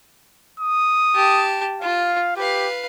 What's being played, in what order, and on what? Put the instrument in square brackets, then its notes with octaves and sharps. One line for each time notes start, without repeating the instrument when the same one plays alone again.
[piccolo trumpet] D#6
[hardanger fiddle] G4 A5
[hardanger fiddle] F4 [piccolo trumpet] F5
[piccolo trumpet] G4 [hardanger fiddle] B4 F5